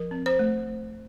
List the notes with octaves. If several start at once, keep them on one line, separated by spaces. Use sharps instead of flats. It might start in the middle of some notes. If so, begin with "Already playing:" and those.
Already playing: F3 A#4
C4
C5
A3